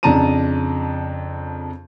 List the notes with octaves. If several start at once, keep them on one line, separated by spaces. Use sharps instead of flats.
F2 C#3 D4 A5 A#5 D#7